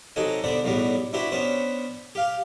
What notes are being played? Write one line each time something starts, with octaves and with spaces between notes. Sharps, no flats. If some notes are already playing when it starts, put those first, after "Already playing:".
C3 F#3 D#4 A4 F#5 G#5
D3 B3 D4 C5 D5
B1 E2 A2 F#3 G3 B3
D4 E4 F#4 G4 B4 C5
B3 C#4 D4 B4 C5
G4 F5